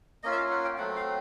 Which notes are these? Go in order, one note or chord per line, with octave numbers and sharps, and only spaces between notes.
A#3 C#4 F4 D#5
E5
F5
F#5
G5
F#3 A3 C4 F#5
F5